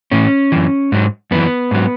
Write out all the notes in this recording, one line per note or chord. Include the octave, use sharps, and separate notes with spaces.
A2 E3 C#4
F#2 E3
G#2 F#3
F#2 E3 B3
G#2 F#3